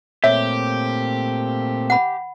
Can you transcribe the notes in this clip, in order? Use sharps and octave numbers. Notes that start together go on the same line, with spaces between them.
A#2 A3 C4 G4 C#5 E5
F#5 B5